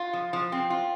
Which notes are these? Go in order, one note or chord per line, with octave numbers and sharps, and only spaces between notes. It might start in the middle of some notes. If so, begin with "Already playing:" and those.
Already playing: F4
F3
F3
C4
F4